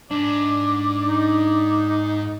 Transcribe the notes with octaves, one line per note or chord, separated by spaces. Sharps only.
G#2 D4 D5
D#4